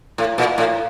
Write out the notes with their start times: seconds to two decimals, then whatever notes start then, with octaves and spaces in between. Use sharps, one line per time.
0.18 A2
0.38 A#2
0.58 A2